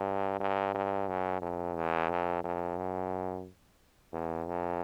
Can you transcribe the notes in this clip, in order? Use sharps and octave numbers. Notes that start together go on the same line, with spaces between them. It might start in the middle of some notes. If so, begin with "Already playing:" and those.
Already playing: G2
G2
G2
F#2
F2
E2
F2
F2
F#2
E2
F2